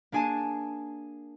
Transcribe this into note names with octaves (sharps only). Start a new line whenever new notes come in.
A#3 D4 G#4 G#5 A5